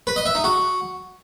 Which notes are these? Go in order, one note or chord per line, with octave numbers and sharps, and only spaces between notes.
B4
D#5
E5
D#4
F#4